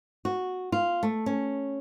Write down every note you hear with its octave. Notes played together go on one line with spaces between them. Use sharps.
F#4
F4
A3
C#4